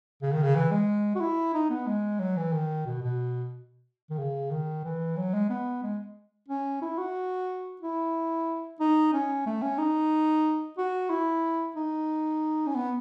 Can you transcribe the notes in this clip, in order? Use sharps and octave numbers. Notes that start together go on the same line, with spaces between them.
C#3
D#3
C#3
E3
G#3
F#4
E4
D#4
B3
G#3
F#3
E3
D#3
B2
B2
D#3
C#3
D#3
E3
F#3
G#3
B3
G#3
C#4
E4
F#4
E4
D#4
C#4
A3
C#4
D#4
F#4
E4
D#4
C#4
B3